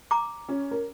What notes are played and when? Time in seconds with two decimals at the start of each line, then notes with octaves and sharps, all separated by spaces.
0.11 A#5 D6
0.49 C#4
0.71 A#4